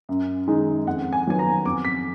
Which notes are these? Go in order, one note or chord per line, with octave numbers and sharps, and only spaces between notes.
F#2
D#3 G#3 D#4
F2 F#5
G#5
D#3 F#3 B3 G#5
A#5
F2 D6
B6